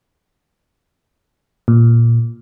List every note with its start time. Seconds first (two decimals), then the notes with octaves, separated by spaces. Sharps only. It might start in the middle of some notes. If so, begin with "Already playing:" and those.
1.68 A#2